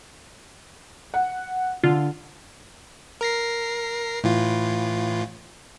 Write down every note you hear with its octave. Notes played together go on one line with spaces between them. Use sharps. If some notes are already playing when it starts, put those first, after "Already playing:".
F#5
D3 F4
A#4 A#6 C7
A2 E3 F4